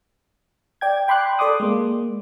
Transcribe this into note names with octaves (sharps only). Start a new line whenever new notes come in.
D5 G5 G#6
G5 B5 C6 D6 F#6
A4 D5 C6 D6 D#6
G#3 A#3